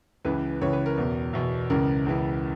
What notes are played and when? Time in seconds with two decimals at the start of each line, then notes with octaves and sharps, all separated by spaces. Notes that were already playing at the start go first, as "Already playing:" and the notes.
0.25 C#2 C#3 E3 B4
0.61 C#2 C#3 E3 C#5
0.73 B4
0.86 A#4
0.97 E2 B2
1.33 E2 B2
1.70 C#2 C#3 E3 A#4
2.06 C#2 C#3 E3